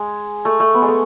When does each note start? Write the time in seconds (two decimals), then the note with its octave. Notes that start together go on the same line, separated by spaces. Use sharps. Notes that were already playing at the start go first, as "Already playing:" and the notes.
Already playing: G#3
0.45 A3
0.60 A3
0.74 B3
0.82 G#3
0.88 A3